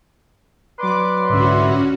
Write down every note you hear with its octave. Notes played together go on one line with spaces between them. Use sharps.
F#3 B4 D5 C6 D6
C2 G#2 D3 C#4 F#4 E5